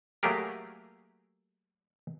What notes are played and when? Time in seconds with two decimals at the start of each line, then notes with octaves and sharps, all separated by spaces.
0.23 F#3 A3 A#3 G4 G#4 A#4